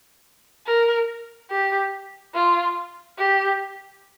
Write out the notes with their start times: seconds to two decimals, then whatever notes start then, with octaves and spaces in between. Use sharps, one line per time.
0.66 A#4
1.50 G4
2.35 F4
3.19 G4